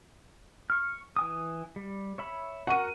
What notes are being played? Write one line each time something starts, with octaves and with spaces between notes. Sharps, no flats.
C#6 F6
E3 G#5 D#6
G3
C#5 E5 B5
F#4 A#4 F#5 C#6 D#7